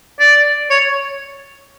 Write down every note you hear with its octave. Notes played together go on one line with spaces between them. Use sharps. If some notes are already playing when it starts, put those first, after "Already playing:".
D5
C#5